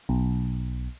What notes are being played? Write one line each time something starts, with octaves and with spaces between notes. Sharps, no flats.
B1